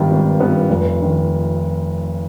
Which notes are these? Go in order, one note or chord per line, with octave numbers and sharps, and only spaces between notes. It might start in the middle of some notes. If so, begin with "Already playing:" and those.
Already playing: G#1 G2 D#3 B3
G#1
G2 D#3 B3
F1
D#3